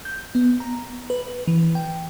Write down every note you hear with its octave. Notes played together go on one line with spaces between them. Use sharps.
G6
B3
A#5
B4
E3
G5